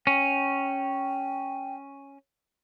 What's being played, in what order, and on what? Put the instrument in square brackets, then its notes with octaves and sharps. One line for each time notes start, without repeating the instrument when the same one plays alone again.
[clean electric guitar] C#4 [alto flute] G5